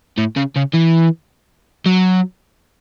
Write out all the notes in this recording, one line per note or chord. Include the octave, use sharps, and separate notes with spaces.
A2
C#3
C#3
E3
F#3